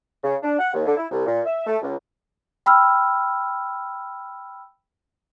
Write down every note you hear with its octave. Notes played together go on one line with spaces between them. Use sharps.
C#3
D4
F#5
D#2
D3
E4
C2
A#2
E5
A3
C#2
G5 B5 E6 F6